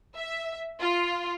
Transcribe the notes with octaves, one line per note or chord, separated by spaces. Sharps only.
E5
F4